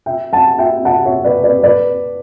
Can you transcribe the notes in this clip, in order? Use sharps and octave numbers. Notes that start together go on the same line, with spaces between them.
E5 G5
F#5 A5
E5 G5
F#5 A5
C#5 E5
B4 D5
B4 D5
B4 D5